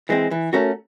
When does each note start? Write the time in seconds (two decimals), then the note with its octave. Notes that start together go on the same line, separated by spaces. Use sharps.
0.09 E3 G#3 C4
0.31 E3
0.53 A3 C#4 F#4 A#4